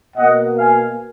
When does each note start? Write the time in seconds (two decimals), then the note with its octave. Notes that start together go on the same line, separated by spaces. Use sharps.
0.16 B2 A#3 D#5 F#5
0.59 F5 G#5